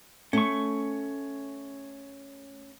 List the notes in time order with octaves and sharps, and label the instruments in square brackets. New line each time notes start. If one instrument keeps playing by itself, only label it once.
[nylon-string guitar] A3 [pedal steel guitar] C#4 C#6